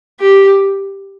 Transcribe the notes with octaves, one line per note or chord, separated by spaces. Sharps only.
G4